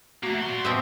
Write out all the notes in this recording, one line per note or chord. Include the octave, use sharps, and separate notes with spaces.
A3 A#3 F#4
A#2 C6
B2 C4 E5